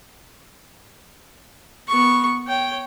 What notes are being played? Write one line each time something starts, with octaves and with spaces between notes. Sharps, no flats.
B3 C#6
C#5 G5